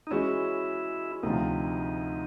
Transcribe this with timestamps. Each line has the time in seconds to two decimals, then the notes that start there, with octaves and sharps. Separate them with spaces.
0.07 D#4
0.11 E3 G#3 C#4 E4 F#4
1.23 D2 C3 F3 D#4